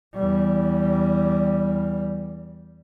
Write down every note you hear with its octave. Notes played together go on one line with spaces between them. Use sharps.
E2 G3